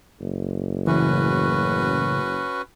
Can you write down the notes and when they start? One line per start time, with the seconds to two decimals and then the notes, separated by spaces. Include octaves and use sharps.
0.21 F#1
0.87 A2 C#3 E3 C#4 F#4 B4